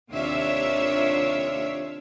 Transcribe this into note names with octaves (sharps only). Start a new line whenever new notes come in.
D#2 C3 D4 F4 C#5 E5